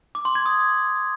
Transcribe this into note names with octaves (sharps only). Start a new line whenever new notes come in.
D6
C6
G#6
D#6